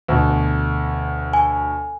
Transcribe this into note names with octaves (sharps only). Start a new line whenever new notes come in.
D2 B2
G#5